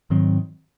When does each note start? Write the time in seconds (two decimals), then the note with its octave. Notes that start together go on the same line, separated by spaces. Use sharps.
0.10 G#2 D#3 F#3 C4